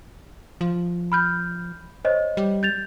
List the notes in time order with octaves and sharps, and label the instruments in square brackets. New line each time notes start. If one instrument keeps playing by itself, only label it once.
[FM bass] F3
[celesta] B5 F6 G6
C5 C#5 D#5
[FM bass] G3
[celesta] G6 A6 F7